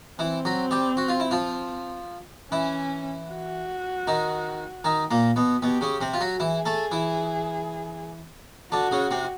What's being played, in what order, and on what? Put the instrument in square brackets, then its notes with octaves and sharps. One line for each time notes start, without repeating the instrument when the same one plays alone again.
[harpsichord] E3 E4 [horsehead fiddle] C4
[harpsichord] F#3 F#4
G3 G4
F#4
F4
E4
F3 F4
[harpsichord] E3 E4 [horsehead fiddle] C#4
[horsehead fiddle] F#4
[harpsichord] D#3 D#4
D#3 D#4
A#2 A#3
B2 B3
[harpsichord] B2 B3 [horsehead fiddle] G4
[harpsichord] C#3 C#4
C3 C4
F4
F#3 F#4
[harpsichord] E3 E4 [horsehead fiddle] G#4
[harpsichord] A3 A4
E3 E4
[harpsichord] D3 D4 [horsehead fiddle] F#4
[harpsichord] C#3 C#4
C3 C4